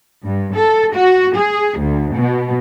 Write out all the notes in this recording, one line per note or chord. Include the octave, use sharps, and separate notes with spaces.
G2
A4
F#4
G#4
D2
B2